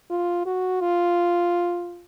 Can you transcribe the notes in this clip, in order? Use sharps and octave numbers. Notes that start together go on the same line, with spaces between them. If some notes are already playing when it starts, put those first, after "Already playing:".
F4
F#4
F4